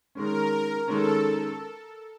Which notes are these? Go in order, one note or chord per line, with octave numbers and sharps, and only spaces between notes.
D#3 G#3 C#4 A#4
D#3 G#3 C#4 A4